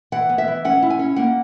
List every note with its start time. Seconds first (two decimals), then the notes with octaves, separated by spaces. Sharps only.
0.12 E3 F#5
0.29 B3
0.38 E5
0.48 E3
0.65 C#4 F#5
0.83 E4
0.90 G#5
0.99 C#4
1.16 A#3 F#5